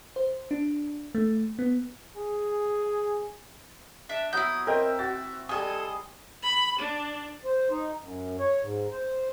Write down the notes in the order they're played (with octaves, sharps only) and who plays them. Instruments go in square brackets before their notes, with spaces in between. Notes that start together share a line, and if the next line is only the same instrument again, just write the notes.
[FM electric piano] C5
D4
A3
B3
[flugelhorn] G#4
[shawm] D4 [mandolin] E5
[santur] F#3 B3 A#5 [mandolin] E4 G6 [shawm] D#6
[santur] C4 G5 [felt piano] A#4 D#5 [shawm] E5
[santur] F#4 [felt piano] A6
[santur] G3 G#4 F5 [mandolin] A4 G#5 [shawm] D#5 [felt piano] D#6
[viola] B5
D4
[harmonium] C5
D#4
F#2
C#5
G#2
C5